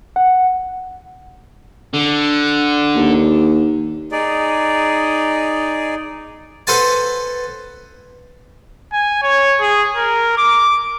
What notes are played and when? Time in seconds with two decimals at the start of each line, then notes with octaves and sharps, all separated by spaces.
0.16 F#5
1.94 D3
2.95 D#2
4.12 D#4 G#4 D5
6.67 A4 B4 C5 F#5 G#5 A5
8.93 G#5
9.23 C#5
9.61 G#4
9.96 A#4
10.38 D6